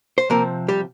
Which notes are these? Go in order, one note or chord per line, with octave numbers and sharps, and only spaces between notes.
C5
C3 F3 A#3 C4 A#4
G3 G4